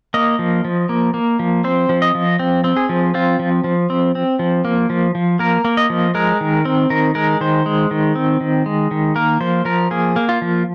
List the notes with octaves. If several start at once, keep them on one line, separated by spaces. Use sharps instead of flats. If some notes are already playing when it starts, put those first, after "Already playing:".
A#3 D#5
F3
F3
A#3
A#3
F3
C4 C5
F3
D#5
F3
C4
C4
G#4
F3
C4 F4
F3
F3
C4
C4
F3
A#3
F3
F3
A#3 A#4
A#3
D#5
F3
G#3 A#4
D#3
C4
D#3 A#4
G#3 A#4
D#3 C5
G#3
D#3
C4
D#3
G#3
D#3
A#3 A#4
F3 C5
F3 A#4
A#3 G#4
A#3
F4
F3